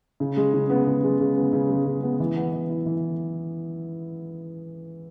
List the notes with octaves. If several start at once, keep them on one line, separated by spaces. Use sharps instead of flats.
C#3
G#3
C#3
B3
C#3
G#3
C#3
B3
C#3
G#3
C#3
B3
E3
B3
E3
E4
E3